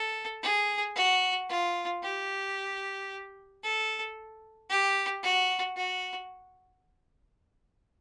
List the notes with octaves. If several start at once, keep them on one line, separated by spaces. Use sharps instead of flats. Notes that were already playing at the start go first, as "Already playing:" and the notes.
Already playing: A4
G#4
F#4
F4
G4
A4
G4
F#4
F#4